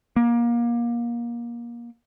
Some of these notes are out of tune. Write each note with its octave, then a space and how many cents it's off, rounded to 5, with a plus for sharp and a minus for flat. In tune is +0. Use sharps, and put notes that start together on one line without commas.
A#3 +25